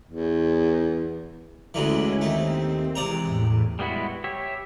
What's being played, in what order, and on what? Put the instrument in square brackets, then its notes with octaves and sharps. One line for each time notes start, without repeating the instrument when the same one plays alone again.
[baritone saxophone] E2
[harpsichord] D2 D3 E3 [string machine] G#3 C#4 E4
[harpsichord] D#2 A3 [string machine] C4
[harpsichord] C3 D5 A#5 [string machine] E3 G#3
[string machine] E2 A2
[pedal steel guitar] G3 G#3 B3 E4 F#4
G4 C#5 E5